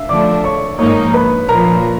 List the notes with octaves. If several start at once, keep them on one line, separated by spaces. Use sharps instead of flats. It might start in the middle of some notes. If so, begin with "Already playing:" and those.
Already playing: E5 F5 E6
D3 F3 A3 D4 D5 D6
C#5 C#6
G#2 F3 A#3 D#4 C#5 C#6
B4 B5
A#2 F3 A#3 A#4 A#5